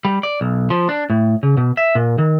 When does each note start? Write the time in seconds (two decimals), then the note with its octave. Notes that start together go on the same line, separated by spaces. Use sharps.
0.05 G3
0.23 D5
0.41 B1
0.70 F3
0.89 D4
1.10 A2
1.43 C#3
1.57 B2
1.77 E5
1.95 A#2
2.18 D#3